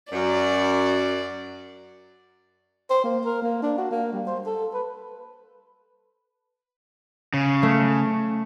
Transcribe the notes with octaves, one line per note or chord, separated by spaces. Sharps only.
F#2 D5
C5
A#3
A#4
A#3
D4
F#4
A#3
G3
C5
A4
B4
C#3
A3